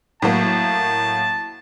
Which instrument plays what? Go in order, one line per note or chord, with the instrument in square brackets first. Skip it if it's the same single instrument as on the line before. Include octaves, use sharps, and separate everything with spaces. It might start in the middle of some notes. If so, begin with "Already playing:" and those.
[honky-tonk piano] A2 F#3 A#3 [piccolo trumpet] A5